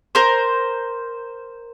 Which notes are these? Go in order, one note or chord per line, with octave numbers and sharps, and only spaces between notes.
A#4 C5